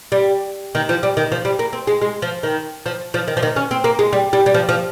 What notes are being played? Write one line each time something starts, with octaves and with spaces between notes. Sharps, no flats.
G3
D#3
F3
G3
D#3
F3
G3
A#3
C4
G#3
G#3
F3
D#3
F3
F3
D#3
F3
D#3
C#4
C4
A#3
G#3
G3
G3
G3
F3
F3